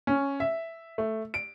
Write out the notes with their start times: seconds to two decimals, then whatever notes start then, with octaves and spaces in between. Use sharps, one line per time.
0.07 C#4
0.40 E5
0.98 A3
1.34 D7